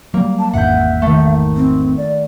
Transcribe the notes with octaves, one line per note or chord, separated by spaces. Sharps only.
F#3 G3 A#3
A5
G#1 E2 G#2 E5 F#5 G6
D#3 A3
C4
D5